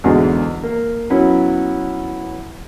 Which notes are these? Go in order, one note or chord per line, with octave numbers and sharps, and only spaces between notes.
E2 G#2 B2 D3 E3 G#3
A#3
F#3 B3 C#4 E4